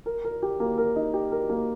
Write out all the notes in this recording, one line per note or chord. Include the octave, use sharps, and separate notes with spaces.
A#4
A#4
G4
A#3
A#4
D#4
G4
A#4
A#3